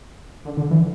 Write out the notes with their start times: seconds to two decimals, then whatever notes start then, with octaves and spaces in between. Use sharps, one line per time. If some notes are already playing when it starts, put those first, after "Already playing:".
0.45 D3
0.57 D3
0.71 E3